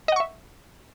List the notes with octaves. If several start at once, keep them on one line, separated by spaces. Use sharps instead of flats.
D#5 E5 F#5 C#6